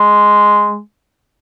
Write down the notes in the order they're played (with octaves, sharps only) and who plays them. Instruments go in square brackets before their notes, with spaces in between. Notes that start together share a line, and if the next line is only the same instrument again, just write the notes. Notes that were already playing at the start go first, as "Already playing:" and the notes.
Already playing: [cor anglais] G#3